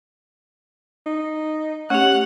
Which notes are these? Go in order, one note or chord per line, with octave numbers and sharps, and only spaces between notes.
D#4
A3 C#4 G4 F#5